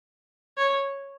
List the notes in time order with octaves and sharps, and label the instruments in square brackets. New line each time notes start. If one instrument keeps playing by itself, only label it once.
[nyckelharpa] C#5